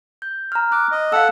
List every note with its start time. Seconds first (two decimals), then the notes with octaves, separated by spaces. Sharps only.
0.22 G6
0.52 A#5 F6
0.72 D6 F#6
0.91 D#5
1.12 A4 F5 F#5 E6